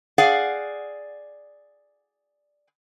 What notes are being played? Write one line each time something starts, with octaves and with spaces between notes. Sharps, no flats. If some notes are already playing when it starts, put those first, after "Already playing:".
G#4 D5 F5 F#5